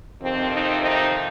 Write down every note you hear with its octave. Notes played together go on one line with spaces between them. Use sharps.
F2 C3 D#3 C4
C4 D#4
C4 D#4